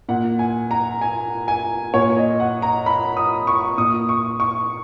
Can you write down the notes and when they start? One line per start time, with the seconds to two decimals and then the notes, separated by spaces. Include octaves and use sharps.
0.09 A#2 F#5
0.39 G#5
0.71 A#5
1.01 G#5
1.48 G#5
1.94 A#2 C#5
2.17 D#5
2.40 F#5
2.62 A#5
2.86 B5
3.17 D#6
3.47 C#6
3.78 A#2 D#6
4.09 C#6
4.40 C#6